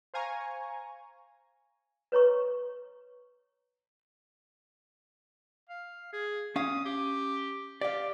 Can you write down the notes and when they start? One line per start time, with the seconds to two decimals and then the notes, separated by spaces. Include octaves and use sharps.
0.14 C5 F5 G#5 A#5 C#6
2.12 B4 C#5 A#5 C#6
5.69 F5
6.13 G#4
6.56 C#4 F5 D#6
6.85 G4
7.81 G4 D5 F5